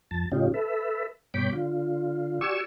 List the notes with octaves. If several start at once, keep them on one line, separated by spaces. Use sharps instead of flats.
F2 A5
A2 C#3 C#4 D#4 F4 G4
A4 B4 E5
G2 B2 C#5 G5 B5 D6
D3 F4
F#4 G4 D5 G#5 C#6 E6